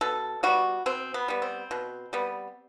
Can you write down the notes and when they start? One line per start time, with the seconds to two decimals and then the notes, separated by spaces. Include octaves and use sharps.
0.01 B2 A4
0.43 G3 B3 F#4
0.86 B2 C4
1.14 B3
1.28 G3 B3
1.42 C4
1.71 B2
2.13 G3 B3